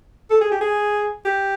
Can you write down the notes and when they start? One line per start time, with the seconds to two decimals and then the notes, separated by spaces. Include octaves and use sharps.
0.30 A4
0.41 G#4
0.51 G4
0.61 G#4
1.25 G4